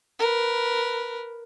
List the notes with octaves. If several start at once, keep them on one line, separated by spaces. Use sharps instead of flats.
A#4 B4